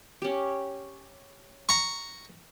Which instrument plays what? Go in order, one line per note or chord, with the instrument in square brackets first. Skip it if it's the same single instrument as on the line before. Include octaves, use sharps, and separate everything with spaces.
[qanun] C#4 G4
[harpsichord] A#5 C#6